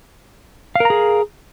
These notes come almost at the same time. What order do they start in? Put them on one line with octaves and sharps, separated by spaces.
F5 A#4 A#5 G#4